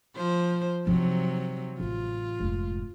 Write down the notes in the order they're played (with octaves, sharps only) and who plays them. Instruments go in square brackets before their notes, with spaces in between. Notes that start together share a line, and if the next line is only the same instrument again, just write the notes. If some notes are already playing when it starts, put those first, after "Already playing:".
[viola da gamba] F3 C5
[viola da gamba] C3 F#3 [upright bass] F3 D#4
[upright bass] A1 [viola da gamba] F4
[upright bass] F1 G#2